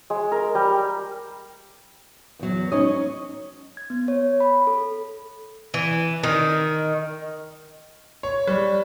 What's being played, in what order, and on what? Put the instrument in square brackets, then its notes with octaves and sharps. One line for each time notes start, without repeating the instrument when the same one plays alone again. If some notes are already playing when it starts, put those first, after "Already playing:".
[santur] G#3
A#4
G3
[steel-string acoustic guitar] E2 F#3
[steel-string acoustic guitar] C#4 [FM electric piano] D#4 C#5 D#6
[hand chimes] G#6
B3
C#5
B5
A4
[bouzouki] E3
D#3
[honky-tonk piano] C#5
G3